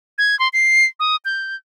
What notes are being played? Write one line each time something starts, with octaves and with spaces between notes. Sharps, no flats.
G#6
C6
C7
D#6
G6